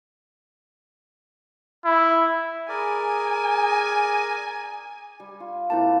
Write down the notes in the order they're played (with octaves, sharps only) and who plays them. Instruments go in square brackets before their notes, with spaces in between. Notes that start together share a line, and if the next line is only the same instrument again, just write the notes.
[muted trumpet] E4
[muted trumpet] G#4 [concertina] A#4 D5 [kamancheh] G#5
[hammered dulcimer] G3
F4
[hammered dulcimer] C3 A#3 F4 [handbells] E4 A5